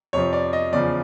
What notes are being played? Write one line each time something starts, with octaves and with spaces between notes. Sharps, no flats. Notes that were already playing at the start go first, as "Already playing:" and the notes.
F2 C3 F3 C#5
D5
D#5
E2 C#3 F3 D5